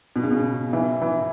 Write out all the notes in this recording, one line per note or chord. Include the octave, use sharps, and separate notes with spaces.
B2
C#3
B2
E3
E3